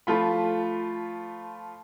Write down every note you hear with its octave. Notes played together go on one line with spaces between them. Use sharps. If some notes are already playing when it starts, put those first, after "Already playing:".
F3 A3 F4 B5